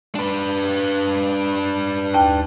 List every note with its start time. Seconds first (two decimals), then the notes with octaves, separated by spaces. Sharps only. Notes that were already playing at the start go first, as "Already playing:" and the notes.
0.15 D4 B4
2.14 D#2 G5 A5